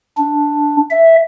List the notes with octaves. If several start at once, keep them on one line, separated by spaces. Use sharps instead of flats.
D4
E5